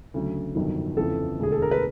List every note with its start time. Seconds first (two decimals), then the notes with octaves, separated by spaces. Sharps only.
0.14 D2 C#3 F#3
0.55 G1 F2 C3 D#3 F#3
0.97 G1 F2 C#3 E3 A4
1.39 E1 D2 D3 G#4
1.52 A4
1.62 A#4
1.71 B4